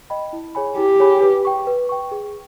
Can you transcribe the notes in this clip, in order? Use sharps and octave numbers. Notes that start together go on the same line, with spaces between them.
D#5 G5 B5
E4
G#4 C#5 G#5 B5
E4 G4
G#4 C#5 G#5 B5
B4
G5 C#6
B4
G5 C#6
G#4